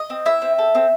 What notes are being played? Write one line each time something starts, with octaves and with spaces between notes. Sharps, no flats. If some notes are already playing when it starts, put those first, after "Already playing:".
Already playing: D#5
C4
E4 E5
C4
A4
C4